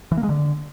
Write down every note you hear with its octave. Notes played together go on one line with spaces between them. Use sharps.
E3
A#3
G#3
D3